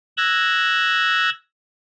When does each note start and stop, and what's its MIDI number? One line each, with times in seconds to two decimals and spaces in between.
0.17 1.30 88
0.17 1.30 90
0.17 1.30 92
0.17 1.30 94